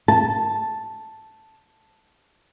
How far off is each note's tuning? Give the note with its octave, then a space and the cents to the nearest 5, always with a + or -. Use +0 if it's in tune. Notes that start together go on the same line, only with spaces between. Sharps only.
A5 +0